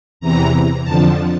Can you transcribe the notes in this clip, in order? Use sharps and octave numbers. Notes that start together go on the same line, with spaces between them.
E2 C3 E3 A#5
F2 D3 F3 A5